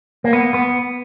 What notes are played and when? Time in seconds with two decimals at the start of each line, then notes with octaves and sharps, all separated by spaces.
0.24 A#3
0.33 B3
0.54 B3